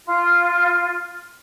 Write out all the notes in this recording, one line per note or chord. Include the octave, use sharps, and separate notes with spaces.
F4